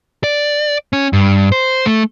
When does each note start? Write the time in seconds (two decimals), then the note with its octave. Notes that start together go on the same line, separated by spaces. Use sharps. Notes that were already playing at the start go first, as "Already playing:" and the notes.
0.24 D5
0.93 C#4
1.13 G2
1.52 C5
1.86 A3